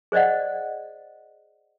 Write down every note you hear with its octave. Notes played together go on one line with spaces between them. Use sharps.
G#4 C5 D5 D#5 F#5